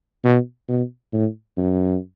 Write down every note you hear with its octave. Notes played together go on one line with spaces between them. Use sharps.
B2
B2
A2
F#2